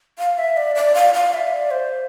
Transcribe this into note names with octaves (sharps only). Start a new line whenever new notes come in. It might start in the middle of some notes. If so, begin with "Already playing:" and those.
F5
E5
D5
D5
F5
F5
E5
D5
C5